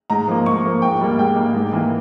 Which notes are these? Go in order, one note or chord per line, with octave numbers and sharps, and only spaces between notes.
G#2 A#5
F3 A#3
G#2 C#6
F3 A#3
G#2 G5
G3 A#3
G#2 G5
G3 A#3
G#2
E3 A#3